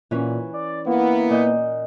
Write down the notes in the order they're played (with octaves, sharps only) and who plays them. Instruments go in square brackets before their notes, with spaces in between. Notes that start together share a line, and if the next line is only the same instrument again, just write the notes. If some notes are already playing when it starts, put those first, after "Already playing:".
[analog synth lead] A#2 [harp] E3 C#4
[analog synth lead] D5
[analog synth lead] A#3 [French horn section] B3 E4
[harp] A#2 D#5 G6